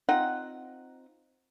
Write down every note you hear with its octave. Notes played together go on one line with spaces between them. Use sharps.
C4 D#4 F4 F#5